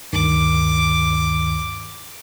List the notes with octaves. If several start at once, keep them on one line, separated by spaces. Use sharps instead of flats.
D2 G2 D#3 D6